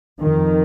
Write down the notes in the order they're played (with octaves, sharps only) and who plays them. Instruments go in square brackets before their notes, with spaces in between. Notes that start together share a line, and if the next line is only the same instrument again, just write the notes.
[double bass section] F2 D#3